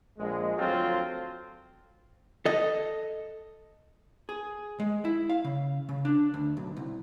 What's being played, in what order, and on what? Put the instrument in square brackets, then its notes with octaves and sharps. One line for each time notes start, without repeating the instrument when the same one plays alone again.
[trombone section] A#1 G#3
D2 F3 F#3 C4 F4 A4
[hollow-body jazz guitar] A4 D#5
G#4
G#3
E4
F5
C#3
C#3
D4
D2
B1
C2